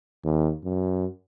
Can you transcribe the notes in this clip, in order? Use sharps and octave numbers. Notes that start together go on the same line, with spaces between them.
D#2
F#2